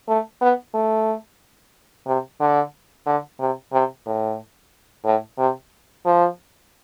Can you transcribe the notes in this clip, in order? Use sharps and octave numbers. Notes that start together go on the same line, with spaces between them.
A3
B3
A3
C3
D3
D3
C3
C3
A2
A2
C3
F3